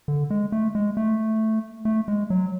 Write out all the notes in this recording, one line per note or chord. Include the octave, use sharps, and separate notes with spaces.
D3
G#3
A3
G#3
A3
A3
G#3
F#3